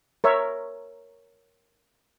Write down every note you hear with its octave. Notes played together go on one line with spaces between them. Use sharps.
A#4 C#5 E5